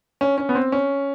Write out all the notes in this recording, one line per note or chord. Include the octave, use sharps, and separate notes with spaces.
C#4
C#4
B3
C4
C#4